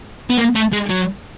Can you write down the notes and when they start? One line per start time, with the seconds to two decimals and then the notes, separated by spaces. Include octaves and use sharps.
0.30 B3
0.38 A#3
0.55 A3
0.73 G#3
0.90 F#3